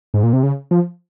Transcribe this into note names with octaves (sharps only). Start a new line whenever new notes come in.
G#2
A#2
C3
C#3
F3